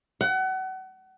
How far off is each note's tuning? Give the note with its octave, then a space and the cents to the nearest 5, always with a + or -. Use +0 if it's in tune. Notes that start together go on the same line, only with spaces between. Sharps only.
F#5 +30